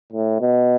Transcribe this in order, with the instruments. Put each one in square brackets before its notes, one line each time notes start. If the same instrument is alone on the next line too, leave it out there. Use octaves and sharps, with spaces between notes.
[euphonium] A2
B2